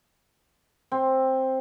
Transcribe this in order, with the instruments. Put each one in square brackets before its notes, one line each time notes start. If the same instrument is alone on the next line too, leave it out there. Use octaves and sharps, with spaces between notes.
[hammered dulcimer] C4